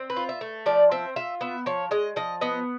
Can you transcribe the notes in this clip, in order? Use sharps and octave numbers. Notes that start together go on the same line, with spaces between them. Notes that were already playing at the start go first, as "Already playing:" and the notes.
Already playing: C4
B4
F4
E5
A3
F3 D5
C4 E5
F4 E5
B3 E5
F3 C#5
G#3 D#5
F3 D#5
B3 D#5